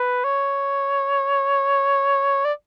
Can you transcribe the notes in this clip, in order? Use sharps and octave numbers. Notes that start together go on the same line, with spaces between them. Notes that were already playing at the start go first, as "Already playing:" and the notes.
Already playing: B4
C#5
D5